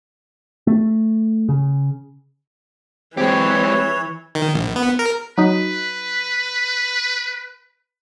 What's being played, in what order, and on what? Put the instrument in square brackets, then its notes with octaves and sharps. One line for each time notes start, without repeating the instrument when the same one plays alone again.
[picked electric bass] A3
C#3
[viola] E3 [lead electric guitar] G#3 G4 [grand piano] C4 G#4 [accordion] C#5
[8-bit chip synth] D#3
A#1
B3
A#4
[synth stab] F#3 D#4 [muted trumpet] B4